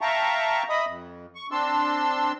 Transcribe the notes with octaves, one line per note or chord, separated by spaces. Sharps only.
E5 F5 G5 A5 A#5 C#6
D#5 E5 B5 D#6
F2
C#6
C4 D4 A5 C6 E6